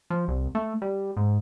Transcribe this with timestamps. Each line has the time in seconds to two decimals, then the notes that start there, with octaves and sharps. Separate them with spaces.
0.10 F3
0.28 C2
0.55 A3
0.82 G3
1.17 G#2